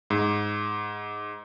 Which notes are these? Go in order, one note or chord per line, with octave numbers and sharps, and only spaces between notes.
G#2